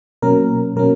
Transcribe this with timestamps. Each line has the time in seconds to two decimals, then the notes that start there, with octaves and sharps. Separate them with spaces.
0.22 B2 F#3 A#3 C#4 A#4
0.76 B2 F#3 A#3 C#4 A#4